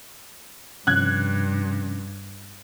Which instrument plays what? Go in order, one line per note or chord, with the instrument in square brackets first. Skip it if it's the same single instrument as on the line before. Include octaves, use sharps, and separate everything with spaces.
[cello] G2 [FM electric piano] C3 F3 C#4 [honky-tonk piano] F#6 G#6